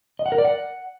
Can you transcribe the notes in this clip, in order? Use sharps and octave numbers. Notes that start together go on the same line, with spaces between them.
D#5
F#5
A#4
D5
F#5